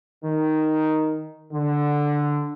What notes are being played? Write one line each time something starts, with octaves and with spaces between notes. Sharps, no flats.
D#3
D3